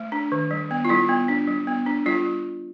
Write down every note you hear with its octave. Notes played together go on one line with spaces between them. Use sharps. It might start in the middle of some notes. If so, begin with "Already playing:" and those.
Already playing: A3
D4
D#3
G3
B3
F4
G3 E4
B3
D4
G3
B3
D4
G3 F4